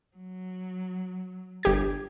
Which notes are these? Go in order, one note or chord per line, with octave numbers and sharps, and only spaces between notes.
F#3
G1 G4 G#6